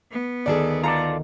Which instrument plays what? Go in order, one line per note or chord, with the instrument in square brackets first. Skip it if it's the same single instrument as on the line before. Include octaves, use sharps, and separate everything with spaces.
[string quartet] B3
[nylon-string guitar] D2 D#3 [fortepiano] G#4 A4 D5
[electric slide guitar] F4 A4 D5 [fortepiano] A#5